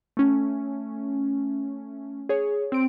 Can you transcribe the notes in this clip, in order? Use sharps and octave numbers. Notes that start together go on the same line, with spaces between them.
A3 C#4
G#4 C#5
C4 D7